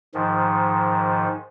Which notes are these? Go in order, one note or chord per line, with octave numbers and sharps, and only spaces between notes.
G#2 D#3 F3